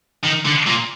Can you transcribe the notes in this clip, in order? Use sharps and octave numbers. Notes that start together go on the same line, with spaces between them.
D#3
D3
A#2